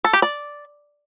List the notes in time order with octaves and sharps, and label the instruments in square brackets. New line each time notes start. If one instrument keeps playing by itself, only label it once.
[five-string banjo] A4
G4
D5